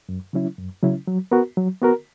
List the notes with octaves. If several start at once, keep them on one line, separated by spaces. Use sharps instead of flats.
F#2
C#3 F#3 C#4 E4
F#2
C#3 F#3 C#4 E4
F#3
B3 F#4 A#4
F#3
B3 F#4 A#4